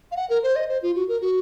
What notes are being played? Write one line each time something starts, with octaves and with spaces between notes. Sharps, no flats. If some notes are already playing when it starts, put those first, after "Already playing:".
F5
F#5
A#4
C5
D#5
C5
F4
F#4
A#4
F#4